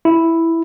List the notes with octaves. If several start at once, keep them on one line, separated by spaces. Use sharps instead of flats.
E4